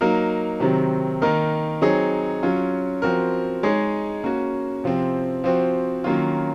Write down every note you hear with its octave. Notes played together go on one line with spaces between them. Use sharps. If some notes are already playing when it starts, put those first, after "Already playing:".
F#3 A#3 D#4 A#4
C3 D#3 F#3 C4
D#3 A#3 D#4 A#4
F#3 C4 D#4 G#4 C#5
F#3 C#4 F4
F3 C4 F#4 A#4
G#3 D#4 G#4 C#5
A#3 C#4 F#4
C3 F3 C4
F3 C4 F#4
D#3 F#3 A#3 C#4 F4